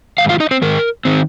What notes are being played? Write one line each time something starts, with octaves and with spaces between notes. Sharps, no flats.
G#2 D#3 F5
F4 F5
D#4 D#5
C4 C5
G#2 D#3 G#3 A#4
D#3 C4